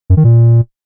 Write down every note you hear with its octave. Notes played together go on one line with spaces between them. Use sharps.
F#2
D#3
A#2